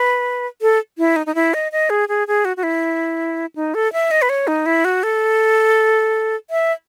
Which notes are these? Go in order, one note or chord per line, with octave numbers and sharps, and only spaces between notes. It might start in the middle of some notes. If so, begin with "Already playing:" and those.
Already playing: B4
A4
E4
D#4
D#4
E4
D#5
D#5
G#4
G#4
G#4
F#4
F#4
E4
D#4
A4
E5
D#5
B4
C#5
D#4
E4
F#4
A4
E5